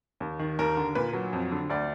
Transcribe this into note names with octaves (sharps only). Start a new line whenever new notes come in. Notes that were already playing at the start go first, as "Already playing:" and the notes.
D#2
D#3
D#2 A#4
D3
A#2 B4
F#3
F2
D3
D2 D5